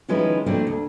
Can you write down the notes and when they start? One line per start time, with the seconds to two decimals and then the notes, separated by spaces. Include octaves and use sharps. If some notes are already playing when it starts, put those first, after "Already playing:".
0.09 D#3 F3 G#3 C#4 E4 B4
0.46 F3 A3 A#3 C4 D4 E4
0.67 D2